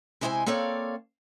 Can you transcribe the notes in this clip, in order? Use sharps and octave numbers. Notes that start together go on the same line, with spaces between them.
C3 G#3 E4 C5 D#5 G#5
A#3 C4 A4 C#5 D5 F5